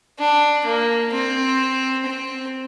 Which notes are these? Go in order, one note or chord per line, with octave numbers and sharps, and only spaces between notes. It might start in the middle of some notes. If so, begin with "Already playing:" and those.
D4
A#3
C4
C4